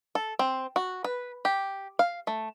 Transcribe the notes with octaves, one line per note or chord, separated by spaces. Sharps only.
A4
C4
F#4
B4
G4
F5
A3